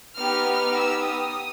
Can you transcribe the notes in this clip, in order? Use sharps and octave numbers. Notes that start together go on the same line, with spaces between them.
B3 D#4 G4 F6
E6
D#6